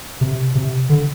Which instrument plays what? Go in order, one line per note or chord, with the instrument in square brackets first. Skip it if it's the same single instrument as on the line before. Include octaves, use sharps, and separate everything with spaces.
[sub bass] C3
C3
D3